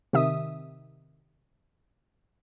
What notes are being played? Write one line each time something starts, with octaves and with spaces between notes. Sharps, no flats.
C3 D#3 E5 D#6